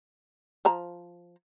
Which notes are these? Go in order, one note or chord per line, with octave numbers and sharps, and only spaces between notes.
F3 C5 A#5